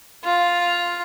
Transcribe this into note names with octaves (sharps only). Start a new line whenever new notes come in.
F4